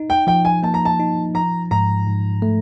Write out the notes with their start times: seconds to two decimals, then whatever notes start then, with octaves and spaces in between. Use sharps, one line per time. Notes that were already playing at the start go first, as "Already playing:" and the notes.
Already playing: D#4
0.10 G5
0.27 F3 G5
0.45 G#5
0.63 A#3 A5
0.74 A#5
0.85 A5
1.00 D#4
1.34 F3 A#5
1.71 G#2 A#5
2.07 G#2
2.42 A3